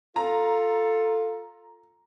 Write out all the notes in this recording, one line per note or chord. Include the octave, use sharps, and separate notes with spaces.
F4 A4 A#5